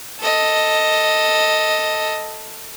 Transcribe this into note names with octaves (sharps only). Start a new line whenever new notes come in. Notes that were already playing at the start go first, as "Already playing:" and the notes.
A4 D#5